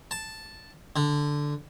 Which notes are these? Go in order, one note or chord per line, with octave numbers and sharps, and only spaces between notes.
A5
D3